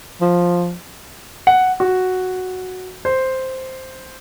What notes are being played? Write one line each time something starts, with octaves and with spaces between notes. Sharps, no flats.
F3
F#5
F#4
C5